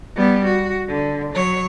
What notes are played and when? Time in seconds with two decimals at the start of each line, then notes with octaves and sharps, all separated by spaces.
0.16 G3 B3
0.45 F#4
0.89 D3
1.32 F#3 C#5